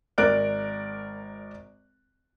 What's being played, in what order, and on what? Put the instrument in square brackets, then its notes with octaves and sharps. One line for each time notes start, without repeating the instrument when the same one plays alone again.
[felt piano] G#1 A#4 D5 F#6 D7